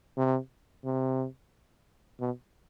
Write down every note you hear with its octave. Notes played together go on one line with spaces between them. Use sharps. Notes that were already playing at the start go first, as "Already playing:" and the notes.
C3
C3
B2